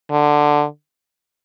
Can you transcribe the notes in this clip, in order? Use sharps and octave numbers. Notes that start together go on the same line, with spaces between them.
D3